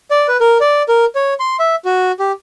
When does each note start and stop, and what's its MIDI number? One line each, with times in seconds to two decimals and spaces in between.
0.11 0.27 74
0.28 0.37 71
0.40 0.58 70
0.61 0.82 74
0.89 1.05 70
1.15 1.34 73
1.40 1.57 84
1.59 1.75 76
1.85 2.12 66
2.20 2.32 67